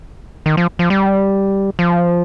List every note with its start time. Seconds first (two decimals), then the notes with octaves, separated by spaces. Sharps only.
0.46 D#3
0.57 F3
0.79 F3
0.90 G3
1.79 F3